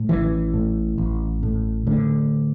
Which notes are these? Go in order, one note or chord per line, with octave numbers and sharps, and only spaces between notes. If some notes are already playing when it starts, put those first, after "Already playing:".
Already playing: A2
A1 E3
A2
A1
A2
A2 D3